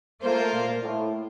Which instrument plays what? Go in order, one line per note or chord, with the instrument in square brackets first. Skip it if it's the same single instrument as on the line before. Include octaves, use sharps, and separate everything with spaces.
[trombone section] A3 [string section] A#3 F4 C5
[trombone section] A#2
A2